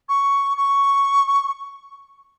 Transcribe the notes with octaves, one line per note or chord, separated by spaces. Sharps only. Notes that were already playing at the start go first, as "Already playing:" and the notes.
C#6
C#6